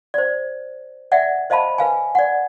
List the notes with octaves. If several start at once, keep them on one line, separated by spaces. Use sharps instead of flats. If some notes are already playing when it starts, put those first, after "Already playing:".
C5 D5
D5 E5 F#5 G5
C5 D#5 F5 A5 B5
B4 F5 G#5
D5 F#5